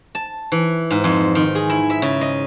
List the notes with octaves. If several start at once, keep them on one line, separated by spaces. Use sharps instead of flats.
A5
E3
G#2
F2
D#3
G#4
E4
E5
C#3
D#5